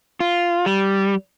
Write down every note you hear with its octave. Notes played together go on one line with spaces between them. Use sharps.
F4
G3